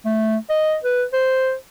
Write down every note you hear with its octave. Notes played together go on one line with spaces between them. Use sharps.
A3
D#5
B4
C5